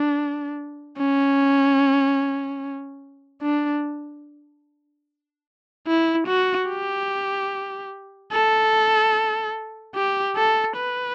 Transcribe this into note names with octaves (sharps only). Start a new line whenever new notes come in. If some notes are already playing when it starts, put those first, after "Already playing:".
Already playing: D4
C#4
D4
E4
F#4
G4
A4
G4
A4
B4